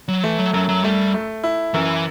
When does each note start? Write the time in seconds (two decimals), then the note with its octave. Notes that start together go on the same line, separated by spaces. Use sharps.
0.08 F#3
0.23 E3 A3
0.38 F#3
0.53 F#2 F#3
0.69 F#3
0.84 G3 A3
1.14 A3
1.44 E4
1.74 F#2 E3